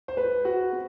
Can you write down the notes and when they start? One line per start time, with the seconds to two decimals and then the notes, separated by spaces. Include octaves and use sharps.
0.08 C5
0.17 B4
0.45 F#4
0.73 C4